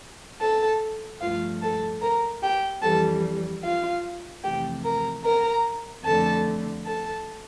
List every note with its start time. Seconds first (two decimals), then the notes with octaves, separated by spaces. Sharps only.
0.40 A4 A5
1.21 G2 F3 A3 F4 F5
1.62 A4 A5
2.01 A#4 A#5
2.42 G4 G5
2.82 F2 E3 G3 A4 A5
3.62 F4 F5
4.43 F2 C3 E3 A3 G4 G5
4.84 A#4 A#5
5.24 A#4 A#5
6.04 F2 D3 A3 A4 A5
6.86 A4 A5